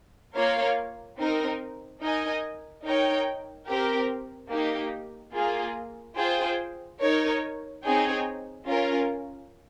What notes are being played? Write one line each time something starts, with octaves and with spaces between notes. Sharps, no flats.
A#3 F4 A#4 C#5 F5
C4 D#4 A#4
D#4 A#4 D#5 G#5
D#4 A#4 C#5 G5
C4 G4 A#4
A#3 D#4 G4
A#3 F4 G#4
F4 G#4 C5 G5
D#4 A#4 C#5
C4 D#4 G#4 C#5 G5
C#4 F4 A#4